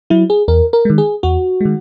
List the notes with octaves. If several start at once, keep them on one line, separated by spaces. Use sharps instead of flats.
F#3 E4
G#4
E2 A#4
A#4
D#3 G#3
G#4
E2 F#4
D#3 G#3